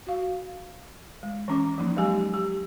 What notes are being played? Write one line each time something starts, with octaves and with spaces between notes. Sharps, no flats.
F#4 F5
G#3
E3 C#4 D6
F3 A#3 D#4
F#3 G#3 G4 G#5
G4